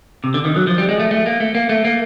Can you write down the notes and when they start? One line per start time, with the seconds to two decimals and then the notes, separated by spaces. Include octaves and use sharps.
0.24 C3
0.34 D3
0.45 D#3
0.56 F#3
0.67 F3
0.78 G3
0.89 G#3
1.00 A3
1.11 A3
1.26 A#3
1.40 A3
1.55 A#3
1.69 A3
1.85 A#3